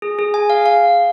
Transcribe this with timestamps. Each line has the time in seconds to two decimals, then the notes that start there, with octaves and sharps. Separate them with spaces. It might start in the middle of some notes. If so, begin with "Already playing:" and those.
0.02 G#4
0.19 G#4
0.34 G#5
0.50 F5
0.66 F5